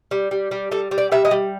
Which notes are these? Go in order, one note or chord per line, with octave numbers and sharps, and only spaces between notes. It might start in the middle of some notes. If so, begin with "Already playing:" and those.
G3
G3
G3
G3 A4
G3
D5
G3 E5
D#5
G3